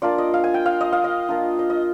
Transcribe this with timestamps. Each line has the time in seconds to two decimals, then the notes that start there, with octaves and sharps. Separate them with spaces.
0.02 A#3 D4 F4 D5
0.18 D#5
0.34 F5
0.44 G#5
0.54 G5
0.66 F5
0.81 D#5
0.92 F5
1.04 D#5
1.29 A#3 D4 F4
1.59 D#5
1.70 D#5